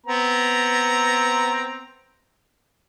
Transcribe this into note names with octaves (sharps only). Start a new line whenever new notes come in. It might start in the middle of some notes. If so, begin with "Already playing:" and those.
B3 C4 A#5